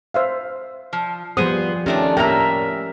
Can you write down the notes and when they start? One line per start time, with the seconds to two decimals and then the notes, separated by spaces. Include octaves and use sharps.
0.14 C5 E5 F5
0.93 F3
1.37 F3 G3 B3 G#4 C5 D#6
1.86 D#3 A3 C#4 D4 G4
2.17 A2 A#3 A#4 E5 G5 A#5